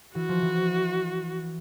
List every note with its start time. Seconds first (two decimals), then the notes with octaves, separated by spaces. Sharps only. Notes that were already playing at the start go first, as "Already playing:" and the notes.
0.15 E3 F#4
0.29 F3
0.42 E3